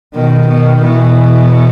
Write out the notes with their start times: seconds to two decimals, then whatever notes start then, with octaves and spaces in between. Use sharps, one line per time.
0.15 B2 D#3
0.48 B2
0.82 B2 E3